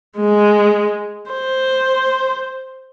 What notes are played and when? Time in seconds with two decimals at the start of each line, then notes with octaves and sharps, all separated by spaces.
0.18 G#3
1.31 C5